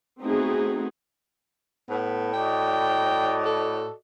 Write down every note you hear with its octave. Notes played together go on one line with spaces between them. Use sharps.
A3 B3 C4 D#4 F#4 G#4
A2 B3
F#4 D5 D#5 G5
A4